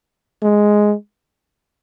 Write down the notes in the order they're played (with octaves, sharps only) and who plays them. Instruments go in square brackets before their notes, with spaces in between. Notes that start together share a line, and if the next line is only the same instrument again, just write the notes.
[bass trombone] G#3